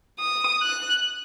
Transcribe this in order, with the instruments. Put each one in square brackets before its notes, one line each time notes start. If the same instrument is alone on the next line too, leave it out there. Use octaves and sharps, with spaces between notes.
[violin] D#6
F#6